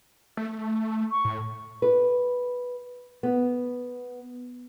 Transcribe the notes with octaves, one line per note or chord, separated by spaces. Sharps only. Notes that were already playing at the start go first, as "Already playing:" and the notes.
A3
C#6
A2
B4
B3